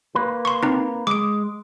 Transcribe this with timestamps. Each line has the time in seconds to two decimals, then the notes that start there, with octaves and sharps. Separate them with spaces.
0.15 A#3 B4
0.45 C6 C#6
0.63 C4 D#4
1.07 G#3 D6 D7